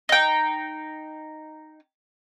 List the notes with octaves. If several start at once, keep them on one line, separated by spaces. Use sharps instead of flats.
D#4 G5